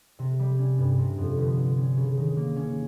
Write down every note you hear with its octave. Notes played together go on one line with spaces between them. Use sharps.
C3
G3
C#4
G2
C3
F2
G1
G1
C#4
C#3
D#3
A#3
C#4